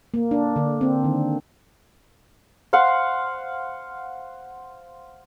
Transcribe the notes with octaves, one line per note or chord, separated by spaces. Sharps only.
A#3
D4
D3
C4
D#3
C5 F5 F#5